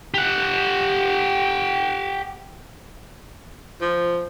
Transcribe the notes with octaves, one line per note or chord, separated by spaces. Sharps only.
G4 F#5
F3